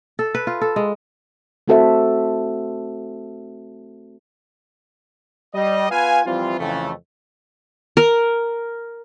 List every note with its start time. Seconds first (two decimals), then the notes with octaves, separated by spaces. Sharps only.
0.19 A4
0.35 B4
0.47 F4
0.61 A4
0.76 G#3
1.68 A3 C4 F#4 A4 C5 E5
5.54 G3 D#5
5.90 B3 F4 B4 F5 G#5
6.25 E3 F3 G3 C4 E4 F4
6.59 F2 C#3 E3 A3
7.97 A#4